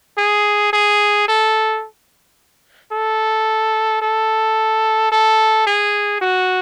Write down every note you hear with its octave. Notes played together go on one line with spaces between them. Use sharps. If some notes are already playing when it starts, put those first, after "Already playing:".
G#4
G#4
A4
A4
A4
A4
G#4
F#4